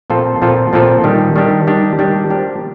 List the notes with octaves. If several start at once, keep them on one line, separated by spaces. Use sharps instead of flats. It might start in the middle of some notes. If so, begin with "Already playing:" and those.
A#2 F3 C4 F4 A4
A#2 F3 C4 F4 A4
A#2 F3 C4 F4 A4
D#3 G3 D4 G4
D#3 G3 D4 G4
D#3 G3 D4 G4
D#3 G3 D4 G4
F3 A#3 D4 G4 A#4